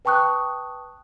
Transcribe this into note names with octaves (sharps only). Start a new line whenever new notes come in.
B4 G5 A5 C#6 D#6 F#6